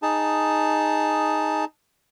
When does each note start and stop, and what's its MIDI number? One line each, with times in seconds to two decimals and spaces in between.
0.02 1.65 63
0.02 1.65 68
0.02 1.65 81